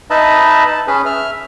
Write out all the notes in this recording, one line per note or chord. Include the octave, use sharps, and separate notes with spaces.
D#4 B4 D#5 E5 A5 B5
A5
C#4 G#4 B4
E5 F6